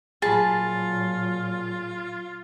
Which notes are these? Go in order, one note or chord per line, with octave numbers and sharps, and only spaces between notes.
A#2 F#3 F4 G#4 A5 B5